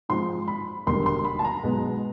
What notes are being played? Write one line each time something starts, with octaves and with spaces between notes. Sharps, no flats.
G#2 F3 G#3 C4 C6
B5
E1 D#2 D3 G3 A#3 C6
C6
B5
A5
A#5
B1 B2 G#3 B3